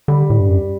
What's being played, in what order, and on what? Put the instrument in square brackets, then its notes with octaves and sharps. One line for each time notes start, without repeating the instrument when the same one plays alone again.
[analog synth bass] D3 [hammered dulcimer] G3
[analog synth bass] A2
G2
F#2